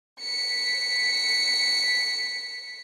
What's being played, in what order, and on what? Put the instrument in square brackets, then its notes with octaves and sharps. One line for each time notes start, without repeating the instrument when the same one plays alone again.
[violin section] B6 C#7